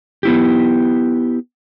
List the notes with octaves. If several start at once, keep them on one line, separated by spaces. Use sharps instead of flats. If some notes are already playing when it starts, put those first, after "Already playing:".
B3 E4 G4